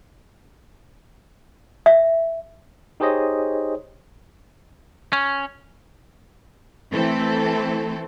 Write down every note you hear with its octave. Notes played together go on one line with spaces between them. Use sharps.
E5
D#4 G4 G#4 C5 C#5 D#5
C#4
E3 A3 C4 A4